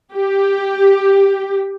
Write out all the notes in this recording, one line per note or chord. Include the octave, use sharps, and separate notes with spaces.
G4